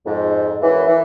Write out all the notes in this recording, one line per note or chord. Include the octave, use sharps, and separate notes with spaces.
F2 G#2
F#2 E3
E3